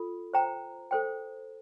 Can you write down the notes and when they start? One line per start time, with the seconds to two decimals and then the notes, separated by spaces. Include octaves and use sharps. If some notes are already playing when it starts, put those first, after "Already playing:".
Already playing: F4 A4
0.33 C5 G5 A#5
0.91 A4 C5 G5